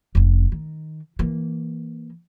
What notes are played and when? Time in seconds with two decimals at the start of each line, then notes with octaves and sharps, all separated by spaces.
0.15 F1 C#4
0.52 D#3
1.19 E3 A#3